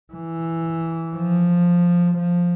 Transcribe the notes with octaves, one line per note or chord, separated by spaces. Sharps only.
E3
F3
F3